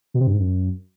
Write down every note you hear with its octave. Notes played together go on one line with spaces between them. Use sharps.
B2
C3
G2
G#2
F#2